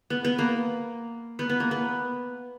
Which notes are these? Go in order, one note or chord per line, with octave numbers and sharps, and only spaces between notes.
B3
B3
A#3
B3
B3
A#3
B3